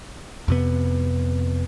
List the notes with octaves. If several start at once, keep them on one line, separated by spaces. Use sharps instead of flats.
F2 C3 B3